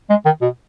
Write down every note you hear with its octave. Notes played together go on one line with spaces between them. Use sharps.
G#3
D#3
B2